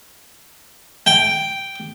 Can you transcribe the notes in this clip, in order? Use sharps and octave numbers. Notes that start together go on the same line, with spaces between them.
G5